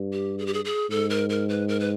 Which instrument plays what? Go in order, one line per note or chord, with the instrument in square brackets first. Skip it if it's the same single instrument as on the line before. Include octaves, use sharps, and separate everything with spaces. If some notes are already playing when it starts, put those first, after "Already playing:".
Already playing: [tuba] G2
[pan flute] G4
G#4
G4
G#4
G#4
[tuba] G#2 [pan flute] A4
[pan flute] A#4
A#4
B4
A#4
B4